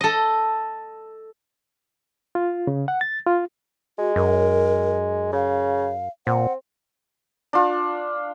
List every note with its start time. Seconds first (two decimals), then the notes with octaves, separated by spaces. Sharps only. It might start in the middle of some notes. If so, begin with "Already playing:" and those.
0.01 A4 D#5
2.35 F4
2.67 C#3
2.88 F#5
3.01 A6
3.27 F4
3.99 G#3 F#4
4.16 F#2 A#4
5.33 C#3 F5
6.27 A#2 C4 F#5
7.53 D4 F4